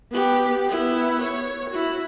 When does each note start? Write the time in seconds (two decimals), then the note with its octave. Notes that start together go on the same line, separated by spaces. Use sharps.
0.12 B3 G4
0.67 B3 E4
1.21 C#5
1.70 E4 F#4